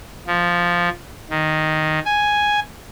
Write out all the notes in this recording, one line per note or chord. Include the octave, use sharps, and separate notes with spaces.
F3
D#3
G#5